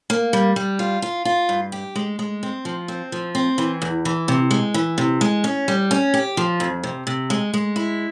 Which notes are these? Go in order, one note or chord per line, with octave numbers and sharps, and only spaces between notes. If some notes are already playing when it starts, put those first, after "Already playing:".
A#3
G3
G3
F4
F4
F4
G2
G4
G#3
G#3
C4
F3
C4
F3
C4
E3
E2
E3
C3
G#3
E3
C3
G#3
C#4
G3
C#4
G4
F3
F2
C3
C3
G#3
G#3
E4